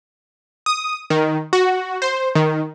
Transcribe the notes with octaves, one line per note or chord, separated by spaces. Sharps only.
D#6
D#3
F#4
C5
D#3